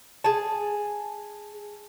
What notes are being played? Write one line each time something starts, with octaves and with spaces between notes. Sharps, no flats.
G#4 A5